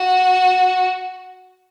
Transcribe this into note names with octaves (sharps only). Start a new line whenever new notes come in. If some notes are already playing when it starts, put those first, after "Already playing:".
Already playing: F#4